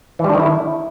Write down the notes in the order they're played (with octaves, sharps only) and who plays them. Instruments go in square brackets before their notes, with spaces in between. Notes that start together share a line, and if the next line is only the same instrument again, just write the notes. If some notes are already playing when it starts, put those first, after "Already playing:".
[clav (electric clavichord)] E3
G3
D4
D#3
E4